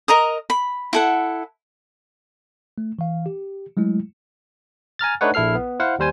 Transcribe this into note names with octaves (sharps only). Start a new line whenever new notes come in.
A#4 D#5 A#5 D#6
B5
E4 A4 F#5
A3
E3 F5
G4
F#3 G#3 A3 E4
G#5 A#5 F6 A6
A3 D4 D#4 B4 C#5 F#5
A#1 E4 A4 F6 C7
B3
E4 C5 F5 F#5
D#2 G3 C5 G#5